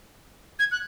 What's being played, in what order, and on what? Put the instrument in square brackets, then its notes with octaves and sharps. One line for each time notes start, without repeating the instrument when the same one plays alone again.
[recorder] G#6
F#6